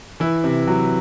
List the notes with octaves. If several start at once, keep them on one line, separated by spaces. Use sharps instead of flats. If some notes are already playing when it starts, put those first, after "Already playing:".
E3 E4
C3
F#3